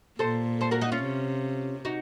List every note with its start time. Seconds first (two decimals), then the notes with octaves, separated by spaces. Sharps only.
0.19 A#2 A4 C5
0.61 A4 C5
0.71 F#4 A#4
0.81 D#4 F#4
0.92 C#4 F4
1.03 C3
1.85 D#4 F#4